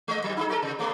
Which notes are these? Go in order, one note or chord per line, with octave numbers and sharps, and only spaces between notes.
G#3 D#5
G#2 F#3
D#4 F4 G#4
F#4 A4 A#4
C3
C#3 A3 B3